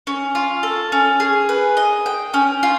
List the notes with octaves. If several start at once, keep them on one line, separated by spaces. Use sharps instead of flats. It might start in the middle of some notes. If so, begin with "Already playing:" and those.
C#4
F4
A4
C#4
G#4
B4
D#5
G5
C#4
F4